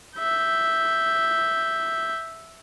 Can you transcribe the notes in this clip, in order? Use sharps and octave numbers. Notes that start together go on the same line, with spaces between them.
E5 G6